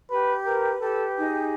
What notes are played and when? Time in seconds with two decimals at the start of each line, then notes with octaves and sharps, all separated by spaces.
0.10 G4 B4
0.46 A#4 B4
0.80 G4 A4
1.16 D#4 G#4